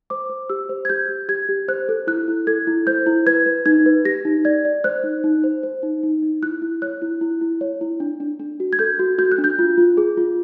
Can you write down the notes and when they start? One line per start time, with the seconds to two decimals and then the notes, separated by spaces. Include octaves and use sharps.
0.10 C5 D6
0.30 C5
0.50 G4 E6
0.69 C5
0.85 G#6
0.89 G4 G6
1.09 G4
1.29 G4 G#6
1.49 G4
1.68 C5 F#6
1.89 A4
2.07 E4 F#6
2.28 E4
2.47 A4 G#6
2.67 E4
2.87 C5 G6
3.06 E4
3.26 B4 G#6
3.46 B4
3.66 D#4 G#6
3.86 B4
4.05 G4 A#6
4.25 D#4
4.45 D5 G#6
4.65 D5
4.84 C5 F#6
5.04 D#4
5.24 D#4
5.44 C5
5.63 C5
5.83 D#4
6.03 D#4
6.22 D#4
6.43 E4 F#6
6.62 E4
6.82 C#5 F#6
7.02 E4
7.21 E4
7.41 E4
7.61 C#5
7.81 E4
8.00 D4
8.20 D4
8.40 D4
8.60 F#4
8.73 G#6
8.79 A4 G6
8.99 F#4
9.18 F#4 G6
9.32 F#6
9.38 D4
9.44 G6
9.59 F4
9.78 F4
9.97 G#4
10.17 F4